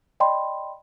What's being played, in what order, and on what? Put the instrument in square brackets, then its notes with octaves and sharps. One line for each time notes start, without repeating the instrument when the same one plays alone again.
[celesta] D5 D#5 G5 B5 C6